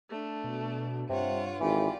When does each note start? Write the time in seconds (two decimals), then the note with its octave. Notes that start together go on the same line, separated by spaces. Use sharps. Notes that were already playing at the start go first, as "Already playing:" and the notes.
0.10 A3 D4
0.44 B2
1.09 G2 C3 F4 C#5 F#5
1.61 G#1 E3 F4 G4 D5